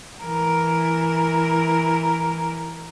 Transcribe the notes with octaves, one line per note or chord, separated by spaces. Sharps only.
E3 A#4